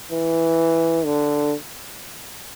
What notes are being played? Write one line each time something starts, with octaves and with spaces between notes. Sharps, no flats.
E3
D3